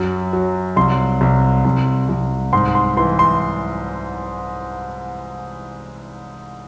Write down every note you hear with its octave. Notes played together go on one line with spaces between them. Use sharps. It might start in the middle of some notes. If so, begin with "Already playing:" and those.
Already playing: F#2 F#3
F#3
C2 C6
C2
C2
C2
G#2 C6
C6
E3 C6
C6